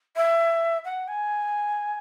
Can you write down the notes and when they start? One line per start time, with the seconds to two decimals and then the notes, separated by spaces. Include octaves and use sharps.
0.16 E5
0.85 F#5
1.08 G#5